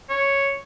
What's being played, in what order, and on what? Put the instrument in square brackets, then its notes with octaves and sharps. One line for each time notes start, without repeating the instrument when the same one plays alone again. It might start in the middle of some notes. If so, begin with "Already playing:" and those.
[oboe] C#5